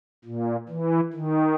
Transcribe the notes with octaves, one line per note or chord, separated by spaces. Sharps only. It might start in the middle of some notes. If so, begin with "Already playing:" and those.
A#2
E3
D#3